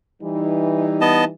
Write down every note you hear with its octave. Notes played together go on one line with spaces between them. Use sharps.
E3 G3 D#4
B3 D#5 A5